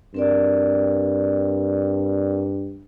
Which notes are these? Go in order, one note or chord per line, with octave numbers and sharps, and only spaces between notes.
G2 C4 A#4 D5